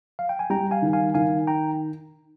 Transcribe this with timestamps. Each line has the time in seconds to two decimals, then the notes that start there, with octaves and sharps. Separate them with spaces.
0.19 F5
0.29 G5
0.39 G#5
0.50 G3 G5 A#5
0.71 F5 G#5
0.82 D#3
0.93 F5 G#5
1.15 D#3 F5 G#5
1.47 G5 A#5